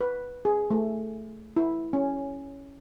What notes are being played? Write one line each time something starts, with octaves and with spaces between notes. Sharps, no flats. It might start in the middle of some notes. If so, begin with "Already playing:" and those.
B4
G#4
A3
E4
C#4